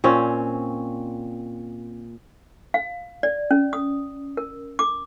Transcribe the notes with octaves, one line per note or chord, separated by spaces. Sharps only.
A#2 C4 C#4
F5
D5
C#4
D#6
A#4
D6